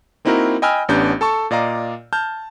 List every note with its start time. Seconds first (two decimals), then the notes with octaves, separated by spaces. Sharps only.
0.25 A#3 C4 D#4 E4 F#4 A#4
0.62 D#5 G5 G#5 B5 E6 F6
0.89 A1 B3 C#4 D4 G4 G6
1.21 A4 A5 C#6
1.51 A#2 D5 D#5 F5 A#5
2.13 A5 F6 G6